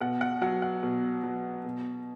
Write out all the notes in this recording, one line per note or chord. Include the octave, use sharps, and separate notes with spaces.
B2 F#5
F#5
F#3 F#5
F#5
B2
F#3
B2